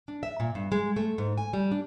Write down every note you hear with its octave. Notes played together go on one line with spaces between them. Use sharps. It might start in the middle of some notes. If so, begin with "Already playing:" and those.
D4
E5
A#2
G2
G#3
A3
G#2
G#5
G3
D4